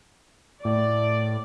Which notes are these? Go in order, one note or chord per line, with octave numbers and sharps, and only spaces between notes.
A2 D5